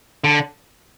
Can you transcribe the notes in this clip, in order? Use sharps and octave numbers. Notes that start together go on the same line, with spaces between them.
D3